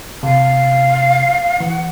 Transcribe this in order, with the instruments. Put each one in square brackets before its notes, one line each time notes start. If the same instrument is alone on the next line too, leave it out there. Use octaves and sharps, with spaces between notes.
[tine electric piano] C3 [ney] F5
[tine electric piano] E3 [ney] F#5